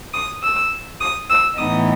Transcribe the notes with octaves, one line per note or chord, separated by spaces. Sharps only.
D#6
E6
D#6
E6
A2 E3 B3 D#4 D#6